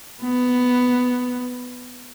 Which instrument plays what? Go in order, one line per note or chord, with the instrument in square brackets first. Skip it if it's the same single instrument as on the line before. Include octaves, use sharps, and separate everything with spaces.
[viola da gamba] B3